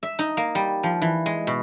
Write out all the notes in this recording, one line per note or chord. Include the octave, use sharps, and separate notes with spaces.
E5
D#4
A#3
G3
F3
E3
G#3
B2